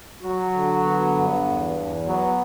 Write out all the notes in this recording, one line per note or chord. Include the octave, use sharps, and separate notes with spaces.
F#3 F#4
D3
B3
G2
E2
E2
F#3 B3